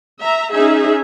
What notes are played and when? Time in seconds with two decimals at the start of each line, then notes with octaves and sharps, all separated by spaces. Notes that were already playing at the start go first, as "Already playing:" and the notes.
0.21 E5 A#5
0.53 C#4 D#4 G#4 E5